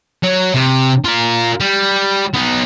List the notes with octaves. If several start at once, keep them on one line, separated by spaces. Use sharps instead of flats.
F#3
C3
F4 A#4
G3
B3 D#4